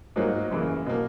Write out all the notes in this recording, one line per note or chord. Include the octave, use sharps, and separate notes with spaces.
G#2 F#3 A#3
F#2 C#3 E3 A#3
B2 A#3